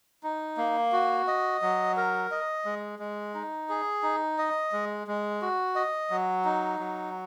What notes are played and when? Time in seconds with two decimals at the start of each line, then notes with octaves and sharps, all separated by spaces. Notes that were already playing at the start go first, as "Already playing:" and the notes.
0.23 D#4
0.57 A#3
0.92 F#4
1.28 D#5
1.62 F#3
1.97 A#4
2.31 D#5
2.65 G#3
2.99 G#3
3.35 D#4
3.69 G#4
4.03 D#4
4.38 D#5
4.72 G#3
5.07 G#3
5.42 F#4
5.76 D#5
6.10 F#3
6.45 D#4
6.79 F#3